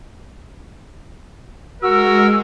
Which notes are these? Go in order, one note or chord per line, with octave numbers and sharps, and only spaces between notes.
G#3 F#4 A#4 E6